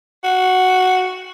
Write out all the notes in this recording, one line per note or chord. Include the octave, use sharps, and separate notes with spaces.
F#4